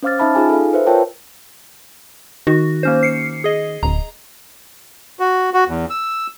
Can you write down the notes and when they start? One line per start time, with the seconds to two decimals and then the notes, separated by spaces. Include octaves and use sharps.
0.03 C#4 C5 F5 D6 F6 A6
0.19 C#4 D#4 E5 A5 B5 F6
0.35 D#4 F4 G#4 G#5
0.50 A4 F5
0.73 B4 C5 E5
0.87 F4 A#4 C#5 G5 A5
2.47 D#3 F#4
2.83 A#3 C#4 C5
3.03 C7 C#7
3.44 G#4 D#5
3.83 D1 A#5
5.20 F#4
5.54 F#4
5.68 E2
5.90 E6